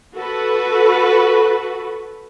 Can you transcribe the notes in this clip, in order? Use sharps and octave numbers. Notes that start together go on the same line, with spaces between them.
F#4 A4 B4